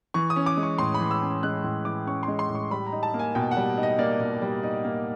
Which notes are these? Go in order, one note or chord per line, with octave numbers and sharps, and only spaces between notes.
E3 C#6
D#6
C#4
D6
G#3
C#6
A2 C6
B5
E3
E6
C#4
G#3 F#6
A2
E3 D6
C#4 C#6
C6
G#3
C6
A2
C#6
G3 B5
A#5
D#4
A5
A#3
G#5
B2 G5
F#5
G3
D#4
D#5
A#3 D5
B2
G3
D#4
A#3